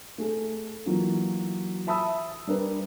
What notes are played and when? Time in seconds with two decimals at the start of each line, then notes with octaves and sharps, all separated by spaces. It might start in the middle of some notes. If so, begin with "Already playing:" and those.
0.18 A3 G#4 A4
0.86 E3 F#3 A#3 F4 F#4
1.87 E5 A5 B5 D#6 E6
2.47 G3 D4 A#4 B4 D5